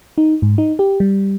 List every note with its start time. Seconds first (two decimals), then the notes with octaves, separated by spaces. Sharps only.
0.18 D#4
0.42 G#2
0.58 D#4
0.79 G4
1.00 G3